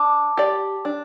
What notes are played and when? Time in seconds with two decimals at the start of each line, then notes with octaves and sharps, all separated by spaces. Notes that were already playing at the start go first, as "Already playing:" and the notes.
Already playing: D4 A5 D6
0.37 G4 D5
0.85 D4